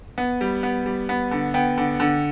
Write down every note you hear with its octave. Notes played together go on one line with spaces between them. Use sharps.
B3
G3
B3
G3
B3
D3
B3 G5
D3
D3